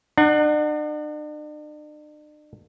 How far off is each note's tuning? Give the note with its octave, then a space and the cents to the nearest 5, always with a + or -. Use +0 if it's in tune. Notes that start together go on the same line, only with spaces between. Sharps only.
D4 +45 F#5 +5